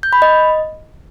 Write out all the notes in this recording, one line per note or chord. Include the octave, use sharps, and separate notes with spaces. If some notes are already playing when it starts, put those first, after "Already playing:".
G6
B5
D#5